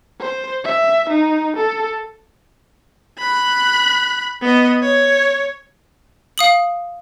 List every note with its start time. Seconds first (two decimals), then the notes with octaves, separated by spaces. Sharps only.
0.20 C5
0.64 E5
1.10 D#4
1.57 A4
3.19 B5 F#6
4.42 B3 D#5
4.82 C#5
6.38 F5 D#6 F#7